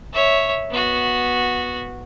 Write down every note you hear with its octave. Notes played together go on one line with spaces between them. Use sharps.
C#5 E5
B3 F#4